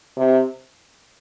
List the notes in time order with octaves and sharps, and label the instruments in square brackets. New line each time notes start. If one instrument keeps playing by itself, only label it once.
[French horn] C3